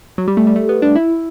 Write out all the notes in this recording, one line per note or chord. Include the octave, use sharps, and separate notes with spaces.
F#3
G3
A3
G3
A3
B3
D4
E4